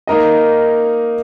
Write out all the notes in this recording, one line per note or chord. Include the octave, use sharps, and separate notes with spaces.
A#3 D#4 A#4 D#5